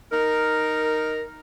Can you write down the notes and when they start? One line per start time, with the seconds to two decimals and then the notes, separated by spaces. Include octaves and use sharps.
0.12 D#4 A#4